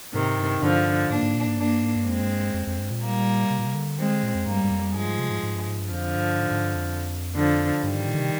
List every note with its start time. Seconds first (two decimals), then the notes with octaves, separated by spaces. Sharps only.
0.14 G#2 C3 D#3
0.38 G2
0.62 G2 D3 F3
1.10 G#2 A#3 D4
1.22 G#2
1.35 A#2
1.47 G#2
1.58 G2 A#3 D4
1.82 G#2
1.95 G2
2.06 F2 G#3 C4
2.20 G2
2.54 F2
2.67 F2
2.79 G2
2.91 A#2
3.03 G3 A#3
3.50 C3
3.59 A#2
3.66 C3
3.75 D3
3.98 D#3 G#3 C4
4.11 D3
4.23 A#2
4.34 F2
4.46 G2 G3 A#3
4.64 G2
4.71 F2
4.94 G2 F3 G#3
5.07 G#2
5.19 C3
5.30 G#2
5.43 G#2
5.55 G2
5.67 G#2
5.78 G2
5.91 F2 D3 F3
6.15 G2
6.39 G#2
6.51 G#2
6.63 G2
6.75 F2
7.35 D3 F3
7.83 G2 D#3 G3
7.95 G#2
8.07 A#2
8.15 D3
8.20 C3